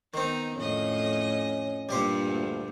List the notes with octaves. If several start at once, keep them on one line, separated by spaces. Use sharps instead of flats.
D#3 B3 C4 D#4
F2 A2 C#4 D#5
G2 A#2 G3 G4 C5
D2